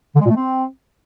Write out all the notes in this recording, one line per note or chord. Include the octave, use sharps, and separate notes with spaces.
D3
G#3
A#2
A3
C4